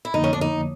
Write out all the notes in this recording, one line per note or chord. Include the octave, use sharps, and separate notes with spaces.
E4
F2 D3 F3 A#3 D#4
C#4
D4
D#4